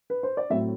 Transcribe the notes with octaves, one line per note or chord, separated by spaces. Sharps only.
B4
C5
D5
A2 F#3 A3 C4 E5